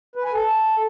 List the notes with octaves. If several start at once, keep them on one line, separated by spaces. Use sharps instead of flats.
B4
G#5
A4